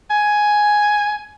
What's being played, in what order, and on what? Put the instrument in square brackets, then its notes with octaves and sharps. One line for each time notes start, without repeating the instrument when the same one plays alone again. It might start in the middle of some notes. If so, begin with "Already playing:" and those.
[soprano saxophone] G#5